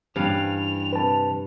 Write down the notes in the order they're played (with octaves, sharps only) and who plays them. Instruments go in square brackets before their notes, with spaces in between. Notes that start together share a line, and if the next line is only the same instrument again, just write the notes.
[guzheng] G2 F5 [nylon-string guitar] E3 C#4 G4 [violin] F7
[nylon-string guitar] C3 [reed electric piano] B4 A5